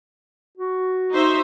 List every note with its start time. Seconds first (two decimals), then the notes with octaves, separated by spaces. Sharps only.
0.57 F#4
1.13 D#4 C5 E5